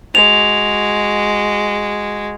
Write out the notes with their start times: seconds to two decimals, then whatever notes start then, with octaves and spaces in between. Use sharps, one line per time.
0.15 G#3 F#4 F7